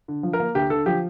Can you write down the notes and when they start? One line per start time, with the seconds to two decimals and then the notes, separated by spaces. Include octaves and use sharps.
0.08 D3
0.23 F3
0.33 A#4
0.40 A#3
0.55 D2 G4
0.70 D3 A4
0.86 F3 G4